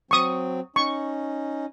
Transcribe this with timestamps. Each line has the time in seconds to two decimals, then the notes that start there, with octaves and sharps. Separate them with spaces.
0.11 F#3 C4 C#6 D#6
0.76 C#4 D#4 C#6